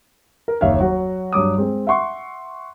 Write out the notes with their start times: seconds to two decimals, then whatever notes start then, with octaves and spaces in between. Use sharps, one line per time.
0.48 A#4
0.61 F#1 D#2 C#5 E5 F5
0.80 F#3 F#4
1.33 G2 F#3 D6 D#6
1.58 G#3 C4
1.87 E5 F#5 C6 C#6